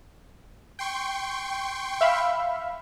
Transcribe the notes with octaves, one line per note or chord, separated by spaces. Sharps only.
G5 C6 C#6
E5 F5 B5